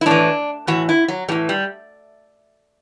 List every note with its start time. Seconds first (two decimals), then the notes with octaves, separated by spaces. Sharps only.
0.01 E4
0.06 A2 E3 D4
0.67 A2 E3 F#4
0.89 E4
1.08 F#3
1.28 A2 G3
1.31 E3
1.49 G3